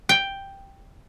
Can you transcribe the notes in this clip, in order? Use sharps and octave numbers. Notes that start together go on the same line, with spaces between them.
G5